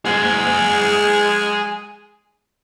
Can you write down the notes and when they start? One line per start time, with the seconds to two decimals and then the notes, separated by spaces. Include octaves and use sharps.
0.05 G#3 G#4 F#5